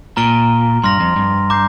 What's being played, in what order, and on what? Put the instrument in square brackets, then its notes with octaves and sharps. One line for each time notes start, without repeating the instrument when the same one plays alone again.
[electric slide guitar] A#2 [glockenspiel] A#5 F6 D7 G7
[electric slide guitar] G2 [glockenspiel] C6 F6 A#6 F7
[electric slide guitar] F2
G2
[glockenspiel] A#5 D6 G6 C7